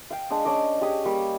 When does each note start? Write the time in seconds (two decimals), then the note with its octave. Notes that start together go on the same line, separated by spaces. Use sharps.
0.10 F5 G5
0.30 G#3 D4 D#6
0.45 C#4 D4 D5 D#5
0.81 G4 G#4 D#6
1.04 G3 A#3 D#6